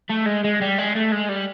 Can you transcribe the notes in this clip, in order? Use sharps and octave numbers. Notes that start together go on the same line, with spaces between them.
A3
G#3
G#3
G3
G#3
A3
G#3
G3